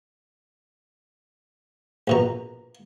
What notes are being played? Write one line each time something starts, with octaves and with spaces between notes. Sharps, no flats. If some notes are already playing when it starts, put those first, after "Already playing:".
A#1 B2 A#5